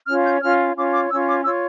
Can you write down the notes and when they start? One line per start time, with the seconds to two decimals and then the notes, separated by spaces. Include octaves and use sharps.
0.08 C#4 F4 C#5 F6
0.25 G6
0.42 C#4 F4 C#5 F6
0.76 C#4 F4 C#5 D6
0.93 D6
1.11 C#4 F4 C#5 E6
1.28 D6
1.45 F4 C#5 E6